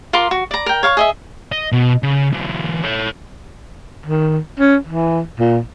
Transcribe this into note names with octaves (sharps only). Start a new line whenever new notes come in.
F4 A#4 C6 D6
F#4
D5 A#5
A#4 G5
C#5 F5 F#5 C#6
G#4 D#5 E5
D#5
B2
C#3
E3 F#3
A4 C#5
D#3
C#4
E3
A#2